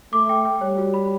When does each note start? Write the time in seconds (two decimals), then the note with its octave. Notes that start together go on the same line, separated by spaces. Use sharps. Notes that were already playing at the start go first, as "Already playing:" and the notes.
0.13 A3 D6
0.29 G5
0.45 G5
0.61 G3 C#5
0.78 F#4
0.94 B5